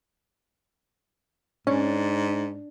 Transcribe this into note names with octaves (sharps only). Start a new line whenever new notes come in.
G#2 C#4 D4